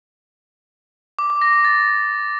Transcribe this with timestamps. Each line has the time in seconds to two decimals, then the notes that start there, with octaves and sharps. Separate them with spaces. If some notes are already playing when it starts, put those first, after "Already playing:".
1.19 D6
1.30 D6
1.42 A#6
1.53 A#6
1.64 A6